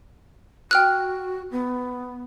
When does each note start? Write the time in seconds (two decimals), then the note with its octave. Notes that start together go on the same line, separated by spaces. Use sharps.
0.71 F#4 G5 F6 F#6
1.51 B3